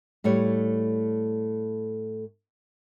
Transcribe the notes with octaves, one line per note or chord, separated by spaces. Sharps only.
A2 G3 A3 C#5